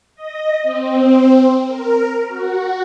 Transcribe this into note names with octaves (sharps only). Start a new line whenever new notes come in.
D#5
C4
A#4
F#4